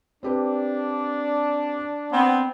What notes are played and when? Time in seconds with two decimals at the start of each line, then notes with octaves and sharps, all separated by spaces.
0.23 C4 D4 G4 B4
2.13 B3 C4